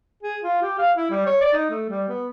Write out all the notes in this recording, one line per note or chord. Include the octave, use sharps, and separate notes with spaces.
G#4
F4
G4
F5
E4
G3
C#5
D5
D#4
A3
G3
B3